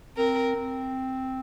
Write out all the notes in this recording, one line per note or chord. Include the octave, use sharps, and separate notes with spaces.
C4 A#4
C4